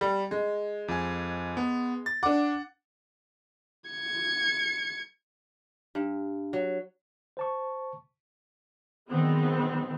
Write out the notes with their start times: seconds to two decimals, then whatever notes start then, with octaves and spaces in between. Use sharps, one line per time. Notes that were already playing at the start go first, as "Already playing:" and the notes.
0.01 G3
0.31 G#3
0.88 F2 G#5
1.57 B3
2.06 A6
2.23 D4 F#5 D6
3.90 G#6 C#7
5.95 G2
6.53 F#3
7.37 C5 A5 C#6
9.10 A#2 D#3 F#3 G#3 B3 C4